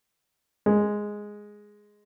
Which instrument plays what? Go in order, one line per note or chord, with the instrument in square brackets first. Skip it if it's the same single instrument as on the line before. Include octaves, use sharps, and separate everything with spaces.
[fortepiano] G#3